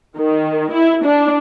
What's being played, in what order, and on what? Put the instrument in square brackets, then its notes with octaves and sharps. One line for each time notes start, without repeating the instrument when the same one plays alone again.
[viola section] D#3
E4
D4